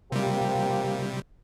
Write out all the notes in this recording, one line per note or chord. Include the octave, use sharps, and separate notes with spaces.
C3 F3 G3 A#3 G4